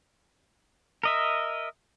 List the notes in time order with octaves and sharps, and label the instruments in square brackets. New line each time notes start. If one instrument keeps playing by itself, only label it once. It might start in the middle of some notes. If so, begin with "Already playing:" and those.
[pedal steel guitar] A#4 D#5 E5